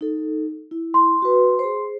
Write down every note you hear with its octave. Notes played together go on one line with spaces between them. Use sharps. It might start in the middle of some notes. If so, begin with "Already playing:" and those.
D#4 A4
E4
C6
F#4 B4
G#4 C5